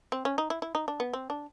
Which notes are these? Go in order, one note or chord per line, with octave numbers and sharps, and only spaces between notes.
C4
C#4
D#4
E4
E4
D#4
D4
B3
C4
D4